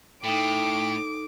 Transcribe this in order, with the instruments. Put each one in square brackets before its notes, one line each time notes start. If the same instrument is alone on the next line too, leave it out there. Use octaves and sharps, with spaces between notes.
[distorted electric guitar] A2 [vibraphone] D#4 A4 [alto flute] G5 [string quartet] D6